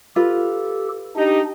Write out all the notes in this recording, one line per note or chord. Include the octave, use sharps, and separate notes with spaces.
F4 G4 A4 B4
D4 D#4 G4